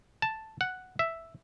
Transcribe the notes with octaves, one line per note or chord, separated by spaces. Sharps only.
A5
F#5
E5